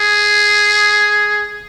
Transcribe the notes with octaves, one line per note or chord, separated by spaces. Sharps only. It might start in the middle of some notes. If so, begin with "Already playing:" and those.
Already playing: G#4